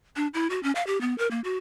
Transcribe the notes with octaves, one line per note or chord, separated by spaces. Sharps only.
D4
E4
F#4
C#4
F5
G4
B3
A#4
A#3
F#4